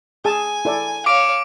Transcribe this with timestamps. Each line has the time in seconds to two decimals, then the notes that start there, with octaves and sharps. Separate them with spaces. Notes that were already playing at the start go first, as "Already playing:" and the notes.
0.25 G#4 G#5 A5
0.65 E4 A4 D5
1.06 C#5 F5 D6 D7